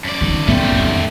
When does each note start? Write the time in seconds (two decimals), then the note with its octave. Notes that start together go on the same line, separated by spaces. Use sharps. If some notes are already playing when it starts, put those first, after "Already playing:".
0.04 F#2 D5
0.21 D#3 C4
0.48 A2 E3 A3 B3 G4
0.72 F2 D#3